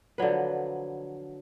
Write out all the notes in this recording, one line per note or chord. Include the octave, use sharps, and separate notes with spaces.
D3 F3 F#3 B4